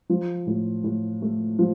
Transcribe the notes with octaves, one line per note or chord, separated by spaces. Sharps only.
F3
A2
A2
A3
F3